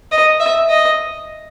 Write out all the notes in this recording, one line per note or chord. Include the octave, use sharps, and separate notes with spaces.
D#5
E5
D#5